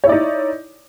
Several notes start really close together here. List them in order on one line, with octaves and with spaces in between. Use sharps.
C#5 E4 D5 D#4